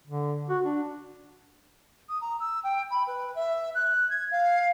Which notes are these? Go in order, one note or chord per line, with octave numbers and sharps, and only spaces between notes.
D3
F#4
D4
D#6
A#5
E6
G5
B5
B4
E5
F#6
G#6
F5